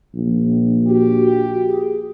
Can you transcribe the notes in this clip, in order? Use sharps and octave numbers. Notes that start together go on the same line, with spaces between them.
A#1
F#4 G4
G#4